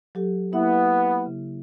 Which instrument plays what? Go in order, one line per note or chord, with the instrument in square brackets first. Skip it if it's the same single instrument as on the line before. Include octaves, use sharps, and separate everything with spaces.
[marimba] F#3 G4 A4
[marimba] A#3 E4 E5 [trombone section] B3
[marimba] C#3